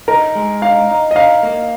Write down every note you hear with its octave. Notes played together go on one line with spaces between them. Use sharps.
D#4 A#4 A#5
G#3
D#4 F5
D#4
D#5
D#4 F5
A#3